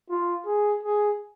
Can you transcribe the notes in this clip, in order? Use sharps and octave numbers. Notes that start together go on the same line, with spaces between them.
F4
G#4
G#4